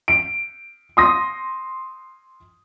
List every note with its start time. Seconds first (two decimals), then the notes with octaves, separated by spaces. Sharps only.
0.08 D7
0.97 C6 D#6 A#6